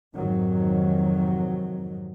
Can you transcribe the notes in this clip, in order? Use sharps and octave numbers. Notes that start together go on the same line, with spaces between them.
F2 G#2 C3 D#3 F#3